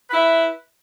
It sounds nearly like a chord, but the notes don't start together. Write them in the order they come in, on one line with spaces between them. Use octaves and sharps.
B4 E4 E5